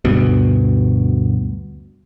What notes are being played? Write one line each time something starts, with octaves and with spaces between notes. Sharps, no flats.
D2 G2 B2